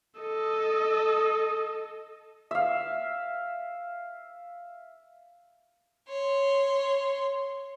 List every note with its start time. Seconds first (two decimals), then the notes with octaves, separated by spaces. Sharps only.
0.21 A4 D#5
2.51 E5 F5
6.09 C#5 C6